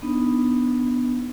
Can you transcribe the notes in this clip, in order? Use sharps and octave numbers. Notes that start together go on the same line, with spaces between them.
B3 D4 D#4